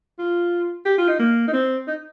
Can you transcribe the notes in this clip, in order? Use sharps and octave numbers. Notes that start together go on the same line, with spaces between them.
F4
G4
F4
D#4
A#3
D#4
C4
D#4